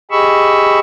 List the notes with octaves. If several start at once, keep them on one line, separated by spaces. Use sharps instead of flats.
G4 G#4 D#5 B5 C#6 E6